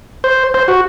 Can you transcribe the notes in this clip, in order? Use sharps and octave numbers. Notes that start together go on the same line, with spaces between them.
C5
C5
F#4